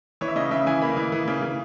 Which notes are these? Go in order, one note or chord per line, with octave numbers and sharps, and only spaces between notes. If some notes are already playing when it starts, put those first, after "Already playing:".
E3 C#5
E5
C#3 D#5
C#3 E5
E3 G#5
A#3 B5
E3
E3
C#3
C#3